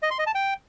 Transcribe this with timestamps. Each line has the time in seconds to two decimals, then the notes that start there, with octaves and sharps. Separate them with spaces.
0.03 D#5
0.11 C6
0.19 D#5
0.27 A5
0.35 G5